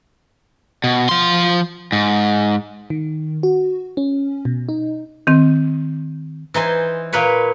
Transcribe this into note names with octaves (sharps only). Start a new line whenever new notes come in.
B2
F3 C6
G#2
D#3
F#4
C#4
B2
D#4
D#3 C4
E3 D#4 C5 G#5
A#2 A#3 B4 C#5